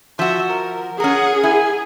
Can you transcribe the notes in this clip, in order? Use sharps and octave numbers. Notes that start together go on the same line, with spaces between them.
F3 F#4 E5
A#4
C#4 G#4 A#4 F#5
E4 G#5